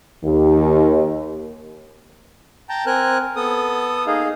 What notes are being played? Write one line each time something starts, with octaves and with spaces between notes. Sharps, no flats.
D#2
G5 A5 A#5
C4 A#4 G#5 F#6
B3 A4 D#6
A#3 D#4 G#4 F5